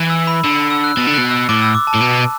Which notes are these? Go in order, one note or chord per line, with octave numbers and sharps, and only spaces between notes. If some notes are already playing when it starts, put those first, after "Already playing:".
Already playing: E3
E6
B5
D3 E6
E6
F#6
B2 A6
D3
B2 F#6
E6
A2 D6
E6
D6
A5
A2
B2